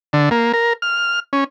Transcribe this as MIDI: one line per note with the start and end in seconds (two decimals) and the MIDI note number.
0.13 0.29 50
0.31 0.52 58
0.53 0.73 70
0.82 1.20 89
1.33 1.44 61